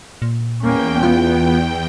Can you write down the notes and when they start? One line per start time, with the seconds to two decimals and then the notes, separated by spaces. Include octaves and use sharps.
0.22 A#2
0.62 E2 A#3 C#4 G5
1.03 B3 F4